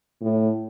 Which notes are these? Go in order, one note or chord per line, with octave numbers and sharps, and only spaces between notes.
A2